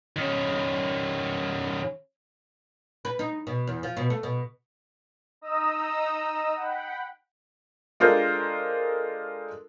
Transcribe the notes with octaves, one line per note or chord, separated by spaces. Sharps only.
D#3 C#4
B4
D#4
B2
E2
F3
B2
A3
B2
D#4 D#5 A#5 D#6 E6
F#5 G5 B5
G#3 D4 F4 A4 A#4 C5